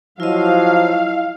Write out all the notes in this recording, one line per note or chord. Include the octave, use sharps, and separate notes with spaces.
F3 F#3 E4 D#5 F5